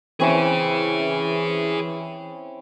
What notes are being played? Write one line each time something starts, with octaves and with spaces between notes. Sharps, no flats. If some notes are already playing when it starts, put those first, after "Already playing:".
E3 C4 C#4 E4 G#4 C#5